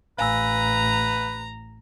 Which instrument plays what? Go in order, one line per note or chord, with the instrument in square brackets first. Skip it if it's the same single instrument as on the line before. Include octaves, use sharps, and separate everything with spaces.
[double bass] A1 [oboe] B4 [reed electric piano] F5 G#5 E6 [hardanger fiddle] A#5